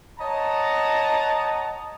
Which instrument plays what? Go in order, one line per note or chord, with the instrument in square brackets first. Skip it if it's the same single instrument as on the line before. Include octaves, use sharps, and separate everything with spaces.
[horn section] C#5 D#5 F#5 A5 A#5